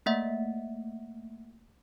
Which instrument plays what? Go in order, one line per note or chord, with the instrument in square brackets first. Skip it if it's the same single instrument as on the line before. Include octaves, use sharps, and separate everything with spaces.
[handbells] A3 A#3 E5 F#5